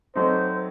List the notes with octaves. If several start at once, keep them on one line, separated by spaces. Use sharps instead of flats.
F#3 A3 C4 D#4 C5